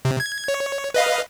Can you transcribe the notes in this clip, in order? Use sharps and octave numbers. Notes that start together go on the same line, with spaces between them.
C3
G#6
C#5
B4 D#5 F5